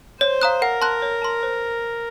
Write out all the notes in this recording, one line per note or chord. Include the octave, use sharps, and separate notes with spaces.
C5 C#5
F5 A#5 D#6 F#6
A#4 F#5
A5 C6 F#6
C#5
A5 C6
C5